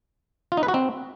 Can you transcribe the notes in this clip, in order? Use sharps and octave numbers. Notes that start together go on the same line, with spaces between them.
F4
D#4
B4
F#4
C4